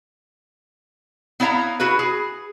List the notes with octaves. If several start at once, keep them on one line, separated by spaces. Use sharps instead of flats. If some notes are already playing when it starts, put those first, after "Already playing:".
B3 E4 C#5 F5 A#5
E4 F#4 G#4 B4
G#4